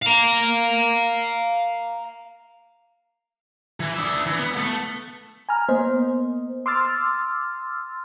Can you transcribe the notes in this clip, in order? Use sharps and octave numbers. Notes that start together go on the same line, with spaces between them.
F5 A#5
E3
D4 E5
E3
B3
A3
G#5 A#5 F6
A#3 B3 C5 D#5
C6 D6 E6 F6 A6